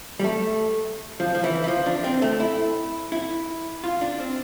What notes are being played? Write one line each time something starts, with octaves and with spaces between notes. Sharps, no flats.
G3
A3
F3
F3
E3
E3
F3
D4
C4
A3
E4
E4
F4
D4
C4